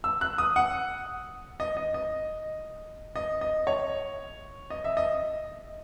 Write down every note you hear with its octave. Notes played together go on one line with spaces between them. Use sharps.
E6
F#6
D#6
F#5
D#5
D#5
D#5
D#5
D#5
C#5
D#5
E5
D#5